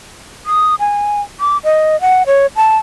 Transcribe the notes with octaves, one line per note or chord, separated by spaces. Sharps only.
D#6
G#5
D6
D#5
F#5
C#5
A5